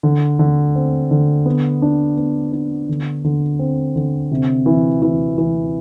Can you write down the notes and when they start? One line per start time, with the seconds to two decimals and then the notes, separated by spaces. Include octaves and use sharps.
0.03 D3
0.39 D3
0.75 C4
1.11 D3
1.46 B3
1.82 D4
2.17 B3
2.52 D4
2.89 D3
3.24 D3
3.59 C4
3.96 D3
4.31 C3
4.66 E3
5.02 E3
5.38 E3